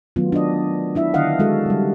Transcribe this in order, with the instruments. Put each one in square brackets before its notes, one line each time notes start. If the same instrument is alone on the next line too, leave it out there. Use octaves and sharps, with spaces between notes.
[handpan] D#3 F#3 A3 B3 F4
D4 D#5
D4 E4 E5
D3 D#3 D4 D#5 F5 F#5
G#3 F#4 A4
C#3 G3